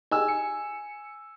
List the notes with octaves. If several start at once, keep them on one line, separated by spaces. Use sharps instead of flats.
D#4 G4 G#4 G#5 E6
C#7